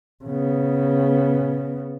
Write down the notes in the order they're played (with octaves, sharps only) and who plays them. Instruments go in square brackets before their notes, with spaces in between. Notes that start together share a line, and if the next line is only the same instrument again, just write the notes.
[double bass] C#3 B3